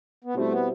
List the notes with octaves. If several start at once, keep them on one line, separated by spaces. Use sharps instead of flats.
B3
B2 G3 A3 C4 E4
B3